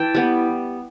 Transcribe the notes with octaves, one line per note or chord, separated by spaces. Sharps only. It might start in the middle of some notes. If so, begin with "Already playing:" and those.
Already playing: E3 G5 A5
G3 B3